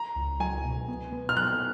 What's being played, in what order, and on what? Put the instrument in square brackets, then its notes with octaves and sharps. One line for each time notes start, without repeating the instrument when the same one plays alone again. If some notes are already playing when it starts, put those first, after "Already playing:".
Already playing: [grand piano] A#5
[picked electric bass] C#2
[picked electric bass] F#3 [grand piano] G#5
[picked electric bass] B2
B3
B3
[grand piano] F6
[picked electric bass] F#3 [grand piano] F#6